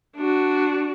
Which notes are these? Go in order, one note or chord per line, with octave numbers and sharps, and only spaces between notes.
D4 F#4